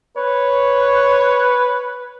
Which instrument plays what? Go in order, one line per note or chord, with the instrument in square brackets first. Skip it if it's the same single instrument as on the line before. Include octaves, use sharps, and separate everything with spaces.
[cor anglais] B4 [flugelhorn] C#5